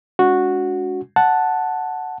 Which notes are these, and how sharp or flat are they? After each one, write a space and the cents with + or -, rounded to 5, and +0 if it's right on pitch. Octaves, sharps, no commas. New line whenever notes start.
G#3 +0 D4 -45 F#4 -10
F#5 +0 A5 +0